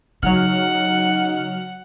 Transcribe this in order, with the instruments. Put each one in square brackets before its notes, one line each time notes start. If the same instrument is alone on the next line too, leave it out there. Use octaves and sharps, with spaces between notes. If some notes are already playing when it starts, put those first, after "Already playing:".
[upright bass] C#3 [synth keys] F#3 F6 [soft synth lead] D#4 [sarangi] F#5